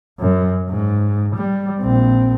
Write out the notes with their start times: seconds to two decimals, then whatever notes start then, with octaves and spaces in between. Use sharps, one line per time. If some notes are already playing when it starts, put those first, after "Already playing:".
0.20 F#2
0.70 G#2
1.35 G3
1.81 A#1 C4